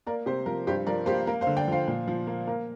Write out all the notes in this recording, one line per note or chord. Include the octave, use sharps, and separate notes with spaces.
A#3 A#4 D5
C3 G4 C5
F3 A#4
G2 G4 C5
F3 A#4 D5
A#3 G4 C5
A#3 A#4
C5 F5
D3
D5 G5
F3 C5 F5
A#2
F3
A#3
A#3 A#4